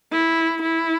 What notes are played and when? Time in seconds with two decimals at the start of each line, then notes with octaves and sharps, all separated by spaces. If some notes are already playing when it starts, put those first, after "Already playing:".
0.12 E4
0.63 E4